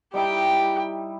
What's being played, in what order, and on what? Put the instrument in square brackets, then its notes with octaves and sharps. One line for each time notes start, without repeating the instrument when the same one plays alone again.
[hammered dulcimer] G3 D#4 E4 [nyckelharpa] G4 G5